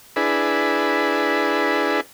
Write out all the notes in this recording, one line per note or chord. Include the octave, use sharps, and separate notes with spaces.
D4 E4 G#4 B4